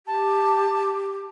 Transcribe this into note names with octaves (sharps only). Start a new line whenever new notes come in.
G4 A5